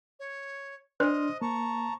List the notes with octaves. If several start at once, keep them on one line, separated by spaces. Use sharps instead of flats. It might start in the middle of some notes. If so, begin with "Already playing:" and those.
C#5
D4 C5 D#5 C6 F6
A#3 A5 A#5 C#6